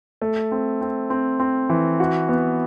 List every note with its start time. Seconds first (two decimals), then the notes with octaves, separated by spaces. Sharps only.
0.22 A3
0.52 C4
0.81 C4
1.10 C4
1.40 C4
1.69 E3
2.00 F#4
2.29 B3